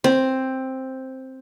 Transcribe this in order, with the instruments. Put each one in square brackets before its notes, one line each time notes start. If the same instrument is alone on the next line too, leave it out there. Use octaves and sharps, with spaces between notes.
[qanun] C4